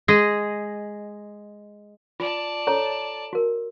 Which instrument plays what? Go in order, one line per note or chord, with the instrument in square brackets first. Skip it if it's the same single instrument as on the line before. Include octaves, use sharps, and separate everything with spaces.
[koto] G#3 G#4 D#5
[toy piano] F4 [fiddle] D5 A5
[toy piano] A4 C#5 A#5
F#4 A#4